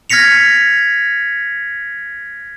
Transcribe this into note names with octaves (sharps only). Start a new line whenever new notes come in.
F6 G#6 A#6 B6 C#7 F7